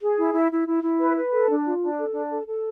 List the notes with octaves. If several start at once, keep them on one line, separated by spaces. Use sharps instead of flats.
G#4
E4
E4
E4
E4
E4
B4
B4
A4
D4
F4
D4
A4
D4
A4
A4